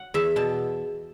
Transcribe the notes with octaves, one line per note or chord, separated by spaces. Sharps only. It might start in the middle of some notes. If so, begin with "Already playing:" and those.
Already playing: F#5
E2 E5
B2 A5